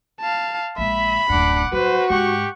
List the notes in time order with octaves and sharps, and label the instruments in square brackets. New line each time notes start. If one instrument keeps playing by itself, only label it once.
[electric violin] F5 A5
[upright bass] A#1 G#3 [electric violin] E5 [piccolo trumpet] B5
[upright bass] D1 F#2 [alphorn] D4 [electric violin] F#5 D6
[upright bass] G1 F#3 [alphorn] F#4 [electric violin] B4 C5
[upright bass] G#2 [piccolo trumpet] G4 [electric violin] F#5 C#6